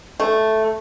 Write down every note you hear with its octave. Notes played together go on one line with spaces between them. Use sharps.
A3